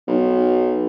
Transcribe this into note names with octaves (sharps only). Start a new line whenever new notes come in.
B1